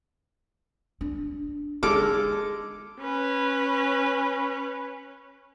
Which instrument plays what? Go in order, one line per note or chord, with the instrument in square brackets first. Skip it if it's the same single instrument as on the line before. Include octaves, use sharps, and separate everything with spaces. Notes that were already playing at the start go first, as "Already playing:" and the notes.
[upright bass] D4
[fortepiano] G#3 A4 F6 [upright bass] D#4 [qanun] D6
[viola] C#4 B4